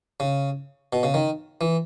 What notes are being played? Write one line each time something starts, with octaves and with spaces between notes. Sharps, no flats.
C#3
B2
C#3
D#3
E3